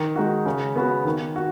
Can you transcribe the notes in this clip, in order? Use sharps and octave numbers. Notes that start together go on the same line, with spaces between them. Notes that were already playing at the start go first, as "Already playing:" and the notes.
Already playing: D#3
G#3 D#4 F#4
C#3
B3 F#4
D#3
F#4